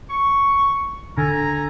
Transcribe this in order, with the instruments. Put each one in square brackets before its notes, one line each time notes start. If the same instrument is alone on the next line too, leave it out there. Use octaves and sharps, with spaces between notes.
[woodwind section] C#6
[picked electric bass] D3 [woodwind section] A4 G#5 A#5